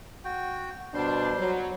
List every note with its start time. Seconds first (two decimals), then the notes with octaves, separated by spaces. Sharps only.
0.24 F#4 G5
0.94 B2 G3 D4 C5 C6
1.39 F#3